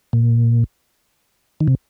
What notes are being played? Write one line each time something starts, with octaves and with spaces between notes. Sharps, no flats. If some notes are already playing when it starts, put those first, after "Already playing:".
A#2
D#3
C3